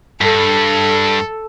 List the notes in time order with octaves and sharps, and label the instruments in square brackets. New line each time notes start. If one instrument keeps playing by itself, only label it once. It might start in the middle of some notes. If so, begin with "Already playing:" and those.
[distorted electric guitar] G2 [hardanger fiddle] A4